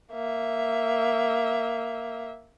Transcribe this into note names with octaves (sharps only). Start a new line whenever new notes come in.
A#3 E5